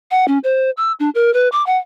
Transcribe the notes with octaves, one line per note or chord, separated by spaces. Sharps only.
F#5
C#4
C5
E6
D4
A#4
B4
D6
F#5